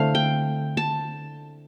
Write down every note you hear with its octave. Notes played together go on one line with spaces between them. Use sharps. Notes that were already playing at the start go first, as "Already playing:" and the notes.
Already playing: D3 A3 C4 E4 C5 F5
G5
A5